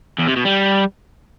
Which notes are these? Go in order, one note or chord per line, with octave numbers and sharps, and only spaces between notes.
E2
C3
B2
G3